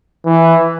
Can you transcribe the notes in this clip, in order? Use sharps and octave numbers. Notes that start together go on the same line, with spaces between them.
E3